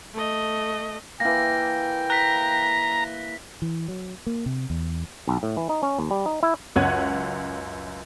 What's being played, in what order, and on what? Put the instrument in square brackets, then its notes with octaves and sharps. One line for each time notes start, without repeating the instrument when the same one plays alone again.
[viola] A3 D#5
[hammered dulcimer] E3 A#3 [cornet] G5 [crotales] A#6
[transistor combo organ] A#5 [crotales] F#6 B6
[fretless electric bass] E3
F#3
A#3
C3
E2
[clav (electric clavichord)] B1
A2
E3
D#4
C#4
D#2
G3
D#4
E4
[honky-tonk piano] C#2 F#2 C#5 F#5 G#6 D#7